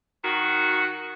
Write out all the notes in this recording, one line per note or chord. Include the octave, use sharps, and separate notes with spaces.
D#3 F#4